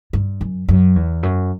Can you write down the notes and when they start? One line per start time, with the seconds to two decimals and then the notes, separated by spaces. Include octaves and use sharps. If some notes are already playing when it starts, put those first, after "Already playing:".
0.13 G2
0.41 F#2
0.68 F#2
0.96 E2
1.23 F#2